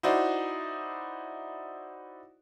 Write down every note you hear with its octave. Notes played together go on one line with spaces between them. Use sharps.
D#4 E4 F#4 C5 D5